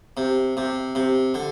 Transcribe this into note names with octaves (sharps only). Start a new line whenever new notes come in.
C3
C3
C3
D3